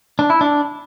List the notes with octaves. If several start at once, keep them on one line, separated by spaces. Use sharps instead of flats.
D4
E4
D4